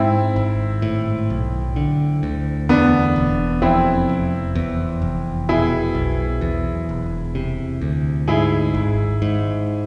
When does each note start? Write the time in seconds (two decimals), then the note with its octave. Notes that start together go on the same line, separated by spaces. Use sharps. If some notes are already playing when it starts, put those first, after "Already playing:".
Already playing: G#2 C4 E4
0.36 G#1
0.82 A2
1.30 B1
1.76 D3
2.23 D2
2.69 E2 B3 D4
3.16 E1
3.62 F2 C4 E4
4.09 F1
4.55 E2
5.02 F1
5.49 B2 E4 G#4
5.95 B1
6.41 E2
6.89 E1
7.35 C3
7.82 D2
8.28 G#2 E4 G#4
8.74 G#1
9.22 G#2